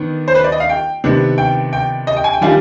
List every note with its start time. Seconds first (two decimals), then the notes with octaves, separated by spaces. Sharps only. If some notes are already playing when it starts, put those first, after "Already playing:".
Already playing: D#3 B3 D4
0.28 C5
0.35 B4
0.44 D5
0.52 D#5
0.60 F5
0.69 G5
1.04 C3 D#3 B3 D4
1.38 G5
1.73 G5
2.07 D#5
2.17 G5
2.24 G#5
2.33 G5
2.41 D#3 G3 D4 F4 G#5